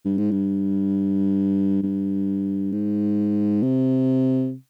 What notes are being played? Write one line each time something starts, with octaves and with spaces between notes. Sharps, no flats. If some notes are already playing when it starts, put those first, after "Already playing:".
G2
G#2
G2
G2
G#2
C3